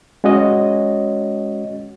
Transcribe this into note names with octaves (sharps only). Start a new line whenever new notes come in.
G#3 C#4 F#4 C#5 D#5